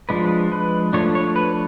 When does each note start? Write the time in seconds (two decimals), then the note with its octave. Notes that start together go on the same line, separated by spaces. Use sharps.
0.09 F3 G#3 D4 B4
0.52 B4
0.93 F3 A3 D4 C#5
1.15 C#5
1.36 B4